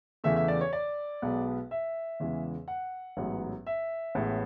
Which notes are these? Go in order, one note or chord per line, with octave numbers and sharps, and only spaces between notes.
E2 C#3 E3 A3 E5
E5
D5
C#5
D5
B1 B2 G#3 B3
E5
E2 C#3 E3 G#3
F#5
A1 G#2 F#3 B3
E5
A1 A2 G#3 B3